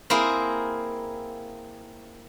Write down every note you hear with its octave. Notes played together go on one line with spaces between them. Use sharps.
A#3 C4 E4 G#4